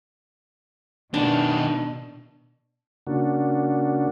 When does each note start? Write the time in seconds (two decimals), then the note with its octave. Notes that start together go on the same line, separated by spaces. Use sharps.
1.14 B2 D#3 B3 D4
3.07 C#3 A#3 D4 F#4